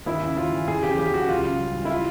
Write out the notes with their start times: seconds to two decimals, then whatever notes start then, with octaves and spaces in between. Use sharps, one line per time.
0.06 D#2 E4
0.23 C#3
0.37 D#2 F4
0.52 E3
0.68 E2 G#4
0.83 C#3 G4
0.98 E2 G4
1.14 F#3 F#4
1.29 C#2 F4
1.44 C#3
1.59 G3
1.75 E3
1.85 E4
1.90 F4